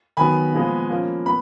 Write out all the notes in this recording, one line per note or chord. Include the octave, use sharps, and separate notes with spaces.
D#3 F#3 B3 G#5 B5
A#2 F3 G#3 B3
F3 A#3 C#4
B3 B5